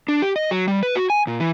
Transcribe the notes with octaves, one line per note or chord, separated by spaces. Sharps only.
D4
G4
D#5
F#3
G3
B4
F#4
G#5
A#2
E3